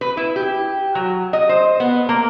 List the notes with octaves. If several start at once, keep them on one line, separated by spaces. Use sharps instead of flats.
B4
E4
G4
F#3
D#5
C5
B3
A#3